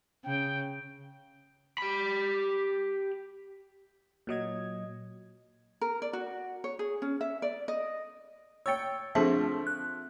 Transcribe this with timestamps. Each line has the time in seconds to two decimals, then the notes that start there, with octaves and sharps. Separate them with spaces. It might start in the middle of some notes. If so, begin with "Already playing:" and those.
0.24 C#3 G5
1.78 G4 B5
4.27 A#2 F#3 D#5 G#6
5.81 A#4
6.02 D5
6.13 F#4
6.64 C#5
6.79 G#4
7.02 C#4
7.21 E5
7.42 D5
7.68 D#5
8.66 C#5 G5 E6 A6 C#7
9.15 D3 F3 A3 C4 G#4 A5
9.67 F#6